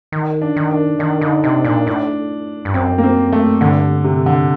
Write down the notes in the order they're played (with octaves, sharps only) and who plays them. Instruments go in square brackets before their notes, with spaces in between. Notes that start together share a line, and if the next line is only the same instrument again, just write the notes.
[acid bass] D#3
[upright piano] D4
[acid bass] D#3
[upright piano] D4
[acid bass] D#3 [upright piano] D4
[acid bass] D3 [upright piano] D#4
[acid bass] C3 [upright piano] D4
[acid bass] A#2 [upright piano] D4
[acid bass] A2 [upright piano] D4
[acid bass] G2
[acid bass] F#2 [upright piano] C4
[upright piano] A#3
C4
A3
[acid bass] G2 [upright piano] D3
[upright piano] C3
D3